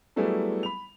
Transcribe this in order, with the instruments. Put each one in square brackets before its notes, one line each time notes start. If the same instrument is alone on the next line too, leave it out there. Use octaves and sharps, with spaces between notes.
[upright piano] F#3 G3 A3 B3 E4 G#4
B5 F7